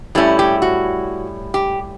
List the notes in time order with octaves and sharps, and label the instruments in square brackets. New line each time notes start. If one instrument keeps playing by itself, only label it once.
[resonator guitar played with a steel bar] A2 G3 C#4 E4
G4
F#4
G4